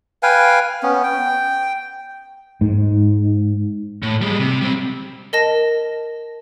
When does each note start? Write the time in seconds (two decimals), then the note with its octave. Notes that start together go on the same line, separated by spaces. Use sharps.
0.23 B4 F5 G5 G#5
0.83 B3 C#4
1.03 G5
2.61 G#2
4.03 A2
4.22 G3 G#3
4.39 C3
4.61 G3 C4
5.33 A#4 D#5 A5 A#6